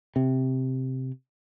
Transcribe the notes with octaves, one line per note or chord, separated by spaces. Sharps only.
C3